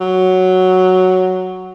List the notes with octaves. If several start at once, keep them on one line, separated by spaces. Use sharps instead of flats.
F#3